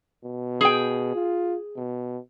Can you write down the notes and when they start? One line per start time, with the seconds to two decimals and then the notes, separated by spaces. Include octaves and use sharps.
0.24 B2
0.61 G#4 G5
1.15 F4
1.77 B2